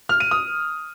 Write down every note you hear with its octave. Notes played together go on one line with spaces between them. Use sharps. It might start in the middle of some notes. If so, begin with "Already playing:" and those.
F6
D#7
D#6